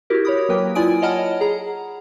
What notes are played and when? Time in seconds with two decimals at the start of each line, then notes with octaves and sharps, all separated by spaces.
0.10 E4 F#4 G4 A#4
0.25 C#5 B5 D#6
0.49 F#3 A#3 A#4 B4 G5
0.75 E4 F4 D5 G#5 D#6 D7
1.02 C#5 D#5 F#5 A5 B5 F6
1.41 G#4 F#5 A#5